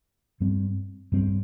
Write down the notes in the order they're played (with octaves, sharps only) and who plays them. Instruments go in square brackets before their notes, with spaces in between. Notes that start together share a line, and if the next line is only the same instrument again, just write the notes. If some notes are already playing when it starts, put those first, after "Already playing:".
[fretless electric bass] G2 G3 C4
G2 G3 C4